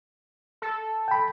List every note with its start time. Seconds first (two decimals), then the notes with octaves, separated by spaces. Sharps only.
0.62 A4
1.08 G5 B5